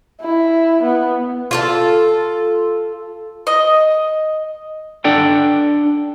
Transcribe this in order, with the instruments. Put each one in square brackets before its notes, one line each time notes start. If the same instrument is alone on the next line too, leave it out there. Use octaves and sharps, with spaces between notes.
[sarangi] E4
B3
[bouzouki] F4 F#4 A4
[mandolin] D#5
[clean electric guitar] D4 A4 D5 F#5 G5